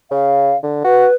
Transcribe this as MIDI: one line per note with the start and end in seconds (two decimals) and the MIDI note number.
0.11 0.54 49
0.11 0.57 77
0.63 0.82 50
0.84 1.07 66
0.84 1.14 71